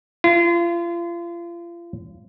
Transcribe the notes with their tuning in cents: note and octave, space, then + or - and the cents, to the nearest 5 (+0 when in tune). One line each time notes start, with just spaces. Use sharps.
F4 -35